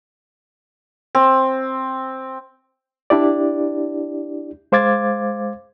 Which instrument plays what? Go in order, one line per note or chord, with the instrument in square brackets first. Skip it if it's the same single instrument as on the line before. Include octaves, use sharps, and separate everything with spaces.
[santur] C4
[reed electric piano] D4 E4 G4 D5
G#3 C5 F5 D6 G#6 A6